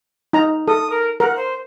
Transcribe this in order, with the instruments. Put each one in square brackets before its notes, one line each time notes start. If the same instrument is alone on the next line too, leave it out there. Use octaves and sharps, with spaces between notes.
[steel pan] D#4 A#5
[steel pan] A4 [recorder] D#6
[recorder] A#4
[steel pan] A#4 [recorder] F#5
[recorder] C5